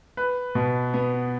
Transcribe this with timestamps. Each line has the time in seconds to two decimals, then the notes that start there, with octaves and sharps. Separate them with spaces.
0.17 B4
0.55 B2
0.94 B3